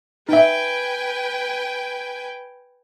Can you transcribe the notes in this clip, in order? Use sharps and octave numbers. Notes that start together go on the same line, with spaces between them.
D#4 B4 E5 G5 G#5